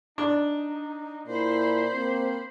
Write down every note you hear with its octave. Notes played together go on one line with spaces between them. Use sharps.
D4 D#4
A#2 E4 C5 B5
A#3 C4